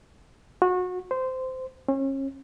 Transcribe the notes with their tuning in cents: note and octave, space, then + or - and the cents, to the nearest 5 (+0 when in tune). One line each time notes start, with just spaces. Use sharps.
F#4 -25
C5 -15
C#4 -35